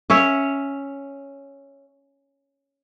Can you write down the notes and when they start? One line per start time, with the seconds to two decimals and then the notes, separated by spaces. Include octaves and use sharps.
0.10 C#4 C#5 E5